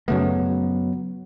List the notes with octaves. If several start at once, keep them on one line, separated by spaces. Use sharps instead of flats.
F#2 C#3 F#3 A3 B3